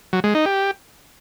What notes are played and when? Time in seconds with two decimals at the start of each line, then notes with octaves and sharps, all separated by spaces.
0.13 F#3
0.24 G#3
0.35 D#4
0.46 G4